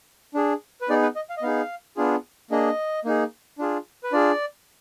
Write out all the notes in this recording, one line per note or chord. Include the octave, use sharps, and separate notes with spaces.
D4 G#4
B4
B3 D#4 G#4 D5
B4
D#5
F5
D#5
B3 D#4 G#4 F5
B3 D4 F4 G#4
A#3 D4 G#4 D#5
A#3 D#4 G#4
D4 F4 G#4
B4
D4 F4 G#4 D5